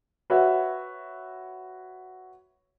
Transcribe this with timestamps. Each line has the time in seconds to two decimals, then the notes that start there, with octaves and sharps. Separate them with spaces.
0.30 F#4 B4 C#5 E5 F#5